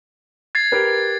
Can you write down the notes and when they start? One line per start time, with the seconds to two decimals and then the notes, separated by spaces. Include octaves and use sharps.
0.55 G#6 A6 C7
0.72 G4 A#4 B4